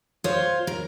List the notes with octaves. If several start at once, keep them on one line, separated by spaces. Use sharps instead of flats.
F4 C5 C#5
A#4